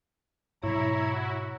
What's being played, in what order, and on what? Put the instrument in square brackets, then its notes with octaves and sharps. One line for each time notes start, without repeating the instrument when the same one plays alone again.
[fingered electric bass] G#2 B2 F#3 [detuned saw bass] E4 [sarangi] C#5 [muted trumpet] A#5
[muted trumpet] F#4